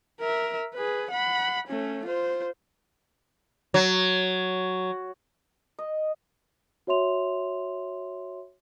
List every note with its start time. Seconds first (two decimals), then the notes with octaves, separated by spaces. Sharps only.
0.21 A#4 E5
0.74 G#4 B4
1.10 F#5 B5
1.67 A3 C#4
2.05 F4 C5
3.74 F#3
5.79 D#5
6.87 F#4 C#5 E5 C6 F7